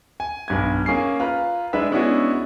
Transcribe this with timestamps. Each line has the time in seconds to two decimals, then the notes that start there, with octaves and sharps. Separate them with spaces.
0.20 G#5
0.48 B1 G2 G#6
0.86 A#3 C#4 G#4 C7
1.20 F4 B4 A#5
1.73 G#3 D4 B4 E5
1.91 G#3 B3 C#4 D4 E4 F#4